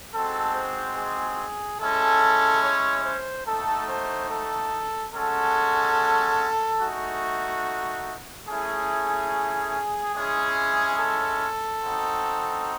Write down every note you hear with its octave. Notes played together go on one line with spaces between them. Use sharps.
G#3 C4 D#4 F#4 A4
C5
G#4
G#3 C#4 E4 A4
C#5
C5
A3 D#4 F#4 A4
C5
A4
G#3 C#4 F#4 A4
A3 D#4 F#4 G#4
A3 C#4 E4 G#4
G#3 C#4 E4 G#4
A4
C4 D#4 F#4